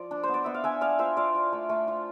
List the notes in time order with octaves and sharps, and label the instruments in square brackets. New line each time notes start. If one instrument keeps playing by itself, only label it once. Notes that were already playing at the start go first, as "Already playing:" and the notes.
Already playing: [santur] F3 D5
D4
B3 C5
D5
B3 E5
F5
D4 E5 G#5
B3 D5 F5
F4 C5 E5
F4 D5 F5
F4
A3
A3
F4